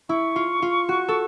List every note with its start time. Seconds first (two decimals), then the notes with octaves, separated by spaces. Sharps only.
0.09 E4 C#6
0.36 F4
0.62 F4
0.89 F#4
1.08 A4